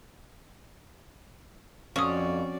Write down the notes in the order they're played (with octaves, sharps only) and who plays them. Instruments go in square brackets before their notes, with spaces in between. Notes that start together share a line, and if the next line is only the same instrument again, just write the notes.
[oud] F2 [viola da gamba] F3 F#4 D5 [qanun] C#4 [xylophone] C#6 D#6